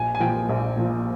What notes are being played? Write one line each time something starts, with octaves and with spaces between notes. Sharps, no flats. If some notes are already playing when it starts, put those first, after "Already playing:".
Already playing: A#1 G#5
G#5
A#2 F3 G5
A#1
A#2 F3